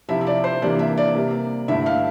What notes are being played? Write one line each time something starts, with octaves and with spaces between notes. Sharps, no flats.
C3 F3 C4 E4 E5
E5
D5
C5
C3 E3 G3 A#3 D4 D5
E5
D5
C3 G3 A#3
G2 D3 A3 E4 E5
F5